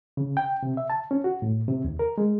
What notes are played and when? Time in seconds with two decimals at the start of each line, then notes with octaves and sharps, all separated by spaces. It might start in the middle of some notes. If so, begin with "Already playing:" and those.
0.17 C#3
0.37 G5
0.63 C3
0.77 E5
0.90 A5
1.11 C#4
1.24 F#4
1.42 A2
1.68 C3
1.84 D#2
1.99 A#4
2.18 G#3